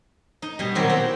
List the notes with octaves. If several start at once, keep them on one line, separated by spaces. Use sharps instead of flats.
D#4
B2 G3
A#2 D#3 F#3 C4 F#4 G4
C4 E4 A#5